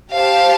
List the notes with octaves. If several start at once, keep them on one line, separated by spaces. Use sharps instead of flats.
G4 C5 F5 A5